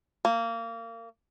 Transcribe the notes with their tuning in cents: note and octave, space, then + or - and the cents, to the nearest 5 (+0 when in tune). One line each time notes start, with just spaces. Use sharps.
A#3 -25